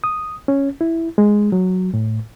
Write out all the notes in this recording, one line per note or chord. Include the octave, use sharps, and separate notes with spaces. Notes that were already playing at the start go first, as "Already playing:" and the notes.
D#6
C#4
E4
G#3
F#3
A2